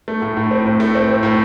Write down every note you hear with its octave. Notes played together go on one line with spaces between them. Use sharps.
A3
A2
A2
C4
A2
A3
C4
C4
A2